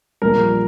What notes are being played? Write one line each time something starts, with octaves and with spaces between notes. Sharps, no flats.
A#1 A#2 G3 A#4